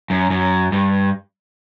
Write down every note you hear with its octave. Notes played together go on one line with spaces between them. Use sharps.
F#2
F#2
G2